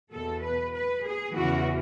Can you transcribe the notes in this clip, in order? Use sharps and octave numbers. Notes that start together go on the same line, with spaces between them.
E2 B2 A4
B4
B4
G#4
E2 C#3 E3 F#4